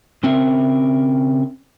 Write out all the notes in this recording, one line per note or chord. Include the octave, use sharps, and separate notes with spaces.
C#3 C4 A#4 E5